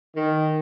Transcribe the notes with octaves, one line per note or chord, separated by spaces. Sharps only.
D#3